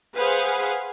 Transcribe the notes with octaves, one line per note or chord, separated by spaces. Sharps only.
G#4 B4 C5 F5 F#5 G#5